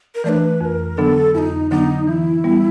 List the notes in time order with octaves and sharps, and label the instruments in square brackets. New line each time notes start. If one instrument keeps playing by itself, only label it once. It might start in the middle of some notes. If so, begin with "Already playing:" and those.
[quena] A#4
[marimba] E3 A3 D4 [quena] B4 D5
[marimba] F2 [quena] B4
[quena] A#4
[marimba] D3 F#3 B3 D4 [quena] A4
[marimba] F2 [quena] D#4 E4
[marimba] D3 F#3 B3 D4 [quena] D#4
[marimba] E3 [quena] E4
[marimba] G3 B3